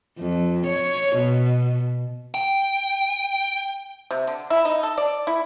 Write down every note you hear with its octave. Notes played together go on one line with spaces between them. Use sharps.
F2
C#5
B2
G5
C3
D3
E4
D#4
A4
D5
E4